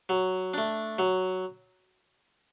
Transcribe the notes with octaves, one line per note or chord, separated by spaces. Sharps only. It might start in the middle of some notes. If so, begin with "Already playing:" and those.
F#3
A3 D4
F#3